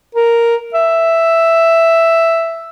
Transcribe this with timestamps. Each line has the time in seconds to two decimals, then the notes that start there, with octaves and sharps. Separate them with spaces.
0.15 A#4
0.74 E5